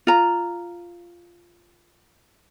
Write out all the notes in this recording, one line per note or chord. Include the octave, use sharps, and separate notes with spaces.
F4 A#5